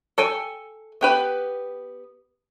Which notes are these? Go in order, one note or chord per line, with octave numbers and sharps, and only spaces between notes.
A4 G5 G#5
B3 G4 B4